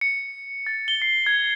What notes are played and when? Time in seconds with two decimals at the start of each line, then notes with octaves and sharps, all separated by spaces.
0.01 C#7
0.67 A6
0.88 G7
1.02 C7
1.26 G#6